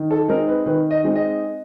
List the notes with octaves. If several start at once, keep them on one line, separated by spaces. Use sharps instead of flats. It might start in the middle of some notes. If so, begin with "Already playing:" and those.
Already playing: D#3
A4
G#3 C4 D#4 A#4
B4
D#3 B4
D#5
G#3 C4 D#4
D#5